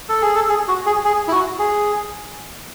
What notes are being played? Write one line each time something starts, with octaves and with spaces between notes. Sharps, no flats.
A4
G#4
A4
G#4
F#4
G#4
G#4
E4
F#4
G#4